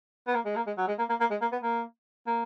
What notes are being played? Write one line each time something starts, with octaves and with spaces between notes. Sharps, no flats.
B3
A#3
G#3
A#3
G#3
F#3
G#3
A#3
A#3
A#3
G#3
A#3
B3
A#3
A#3